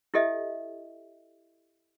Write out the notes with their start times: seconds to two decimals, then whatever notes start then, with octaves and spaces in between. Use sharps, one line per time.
0.14 E4 G4 A4 D#5 E5